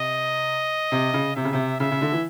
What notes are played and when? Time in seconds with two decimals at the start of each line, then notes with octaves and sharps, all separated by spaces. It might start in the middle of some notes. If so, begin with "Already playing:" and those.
Already playing: C3 D#5
0.92 C3
1.14 C#3
1.36 C3 E5
1.45 C#3
1.53 C3
1.80 C#3 E5
1.91 C#3
2.02 D3
2.12 E3